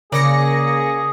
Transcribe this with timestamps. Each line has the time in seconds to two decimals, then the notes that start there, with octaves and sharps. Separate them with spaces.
0.12 C#3 A#3 G#4 D5 D#6 A#6 C#7